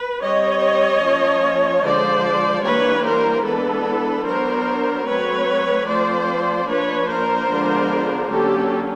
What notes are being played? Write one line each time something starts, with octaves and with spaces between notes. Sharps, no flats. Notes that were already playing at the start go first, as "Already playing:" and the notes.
Already playing: B4
G3 C4 C#5 D#5
F3 A#3 C#4
D3 F3 G#3 C5 D5
E3 G3 A#3 D4 B4 C#5
A#4 C5
E3 G#3 B3 D4 A4 B4
F#3 B3 D4 A#4 C5
F#3 A3 C4 B4 C#5
F3 A3 C4 C5 D5
F3 A#3 D4 B4 C#5
A#4 C5
D3 F3 G#3 B3 D4
D3 F#3 A#3 C#4 G4 A4